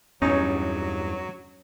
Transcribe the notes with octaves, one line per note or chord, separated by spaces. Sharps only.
E2 G2 F#3 C#4 D#4 C#5